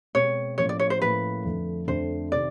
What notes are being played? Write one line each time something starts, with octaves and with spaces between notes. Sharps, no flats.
B2 G#3 C4 C#5
A2 F3 A#3 C#4 C#5
D5
C#5
C5
A2 F3 A#3 C#4 B4
F2 D3 F3 A3 D4
F2 D3 F3 A3 D4 C5
C3 D#3 D5